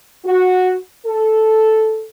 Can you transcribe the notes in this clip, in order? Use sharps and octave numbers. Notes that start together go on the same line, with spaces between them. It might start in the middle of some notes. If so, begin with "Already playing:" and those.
F#4
A4